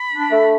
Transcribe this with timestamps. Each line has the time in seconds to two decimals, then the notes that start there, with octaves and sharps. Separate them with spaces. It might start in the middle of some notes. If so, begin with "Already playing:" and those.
Already playing: B5
0.12 D4
0.31 A3